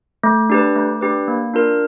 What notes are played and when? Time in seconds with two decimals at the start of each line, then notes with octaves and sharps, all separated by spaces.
0.23 A3
0.50 D4 G4 B4
0.76 A3
1.01 D4 G4 B4
1.28 A#3
1.54 D4 F4 A#4